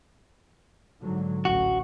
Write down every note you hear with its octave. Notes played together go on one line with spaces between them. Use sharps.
G#2 D3 F#3
A1 D2 F#4